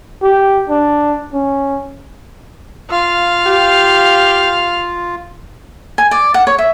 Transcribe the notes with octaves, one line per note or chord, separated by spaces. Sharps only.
G4
D4
C#4
F4 F5
G4
G#5
D5
F#5
C#5
E5